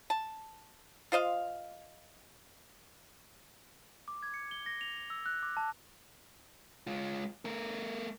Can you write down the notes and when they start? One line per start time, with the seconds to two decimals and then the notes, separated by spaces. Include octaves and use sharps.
0.10 A5
1.12 F4 C5 D#5 F5
4.08 D6
4.23 G#6
4.34 C#7
4.51 G7
4.66 A#6
4.81 F7
4.97 F7
5.10 E6
5.26 F#6
5.43 D6
5.57 A5
6.87 G#3 F4
7.45 A3 A#4